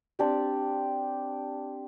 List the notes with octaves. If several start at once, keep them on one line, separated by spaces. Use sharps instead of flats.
C4 D4 G4